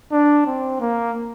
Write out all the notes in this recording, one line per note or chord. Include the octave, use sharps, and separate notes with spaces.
D4
C4
A#3